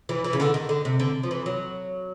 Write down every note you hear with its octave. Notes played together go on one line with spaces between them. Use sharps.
E3
E3
C#3
D3
D#3
D3
C3
D3
F3
E3
F#3